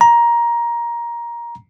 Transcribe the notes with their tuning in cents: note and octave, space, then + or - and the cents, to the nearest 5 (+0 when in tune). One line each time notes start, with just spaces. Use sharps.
A#5 +15